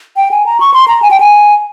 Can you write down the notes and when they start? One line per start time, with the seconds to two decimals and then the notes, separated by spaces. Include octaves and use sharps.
0.17 G5
0.31 G#5
0.46 A#5
0.60 C#6
0.74 C6
0.88 A#5
1.02 G#5
1.11 G5
1.20 G#5